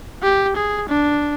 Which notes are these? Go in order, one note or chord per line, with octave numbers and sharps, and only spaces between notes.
G4
G#4
D4